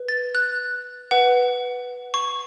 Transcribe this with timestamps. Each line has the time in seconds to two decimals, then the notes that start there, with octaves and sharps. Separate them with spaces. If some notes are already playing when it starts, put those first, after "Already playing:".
Already playing: B4
0.08 A6
0.35 F#6
1.11 B4 F#5
2.14 C#6